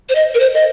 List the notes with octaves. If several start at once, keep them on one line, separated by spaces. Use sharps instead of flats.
C5
D#5
A#4
C5
D#5